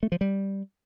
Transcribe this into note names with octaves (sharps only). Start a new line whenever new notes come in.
A3
F3
G3